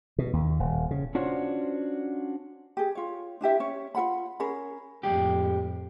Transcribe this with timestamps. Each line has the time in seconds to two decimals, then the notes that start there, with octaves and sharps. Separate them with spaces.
0.18 B2
0.33 D#2
0.60 D#1
0.91 C#3
1.15 C#4 D4 F4 F#4 C5 C#5
2.77 G4 G#4
2.95 F4 C#5
3.41 D4 E4 G4 E5
3.60 C#4 C#5
3.95 F4 A4 F#5 B5
4.40 C#4 G#4 A#4 B5
5.03 F2 A2 G#3 G4